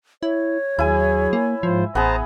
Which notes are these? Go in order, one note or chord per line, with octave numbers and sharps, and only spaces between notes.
E4 C#5
D#2 F#3 E4 G#4 G#5
A#3
G#2 F3 F4 C5
A1 B3 G#4 C5 A5 A#5